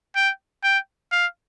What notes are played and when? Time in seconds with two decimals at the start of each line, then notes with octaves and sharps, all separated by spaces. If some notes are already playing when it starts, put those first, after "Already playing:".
0.15 G5
0.63 G5
1.12 F5